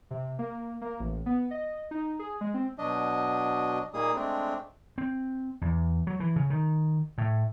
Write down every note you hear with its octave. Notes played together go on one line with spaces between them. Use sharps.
C3
A#3
A#3
A1
B3
D#5
D#4
G#4
G#3
C4
B2 F#3 D4 D#5
A#2 G3 A#3 D#4 G#4 D#6
G#3 A3 C4 D4
C4
E2
F#3
E3
C#3
D#3
A2